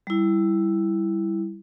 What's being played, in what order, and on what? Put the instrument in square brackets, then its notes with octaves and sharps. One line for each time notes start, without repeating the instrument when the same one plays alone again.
[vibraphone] G3 E4